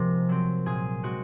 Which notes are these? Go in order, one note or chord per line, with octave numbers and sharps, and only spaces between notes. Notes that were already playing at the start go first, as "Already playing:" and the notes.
Already playing: C3 F3 G#3 A#4
F#3 C4
A#2 G#4
G#3 C4 F#4